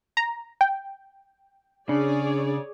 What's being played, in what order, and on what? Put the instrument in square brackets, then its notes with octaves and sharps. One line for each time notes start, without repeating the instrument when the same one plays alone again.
[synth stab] A#5
G5
[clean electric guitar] C#3 [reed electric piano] D4 [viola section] G#4 C#5 D5